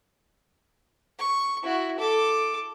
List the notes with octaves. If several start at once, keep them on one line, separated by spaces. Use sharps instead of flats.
C#6
E4 F#4
A4 D6